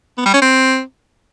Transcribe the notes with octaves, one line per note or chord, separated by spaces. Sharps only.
B3
G3
C#4
C4